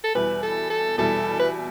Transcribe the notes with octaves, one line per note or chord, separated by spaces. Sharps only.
A4
E2 B2 G3 E4 B4
A4
A4
E2 B2 G3 E4 A4
B4